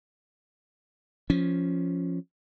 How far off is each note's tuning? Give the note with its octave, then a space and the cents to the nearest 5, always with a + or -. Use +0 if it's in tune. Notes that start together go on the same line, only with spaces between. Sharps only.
F3 +0 C#4 +0